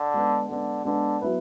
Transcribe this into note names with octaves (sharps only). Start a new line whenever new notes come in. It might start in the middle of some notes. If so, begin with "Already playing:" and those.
Already playing: D3
G#3 B3 D4
D3 G#3 B3 D4
D3 G#3 B3 D4
F#3 B3 E4 B4